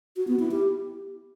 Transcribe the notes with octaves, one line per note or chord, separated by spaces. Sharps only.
F#4
B3
E4
G4